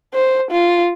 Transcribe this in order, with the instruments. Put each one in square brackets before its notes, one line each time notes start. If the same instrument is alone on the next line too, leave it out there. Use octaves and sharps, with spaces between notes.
[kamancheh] C5
F4